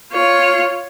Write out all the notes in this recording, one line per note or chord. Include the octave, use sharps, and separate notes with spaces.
F4 C#5